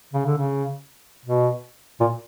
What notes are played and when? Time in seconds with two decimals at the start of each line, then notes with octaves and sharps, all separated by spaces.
0.13 C#3
0.26 D3
0.37 C#3
1.25 B2
2.00 A#2